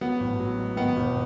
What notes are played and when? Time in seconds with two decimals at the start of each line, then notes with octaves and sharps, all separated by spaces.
0.01 F#3 B3
0.20 A1
0.40 F#3
0.59 G#2
0.77 D#3 B3
0.97 E1